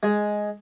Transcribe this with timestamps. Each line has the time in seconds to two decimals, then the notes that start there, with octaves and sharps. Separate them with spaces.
0.03 G#3